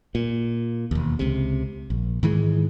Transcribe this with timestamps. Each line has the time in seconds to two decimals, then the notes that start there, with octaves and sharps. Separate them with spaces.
0.15 A#2
0.91 E1 D#2
1.19 C#2 C3
1.90 A#1
2.23 G#2 D#3 E3 G#3